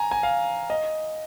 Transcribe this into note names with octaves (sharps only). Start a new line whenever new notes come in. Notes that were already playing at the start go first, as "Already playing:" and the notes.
Already playing: G#5 A#5
G#5
F5
D#5